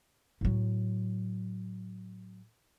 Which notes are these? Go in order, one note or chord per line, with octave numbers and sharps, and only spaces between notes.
A2 F#3